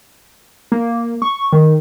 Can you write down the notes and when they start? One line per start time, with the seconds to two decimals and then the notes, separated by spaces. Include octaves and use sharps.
0.72 A#3
1.22 C#6
1.53 D#3